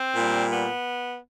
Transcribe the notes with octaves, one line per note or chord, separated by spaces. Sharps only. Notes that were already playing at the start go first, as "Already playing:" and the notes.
Already playing: C4
A#2 G3
B3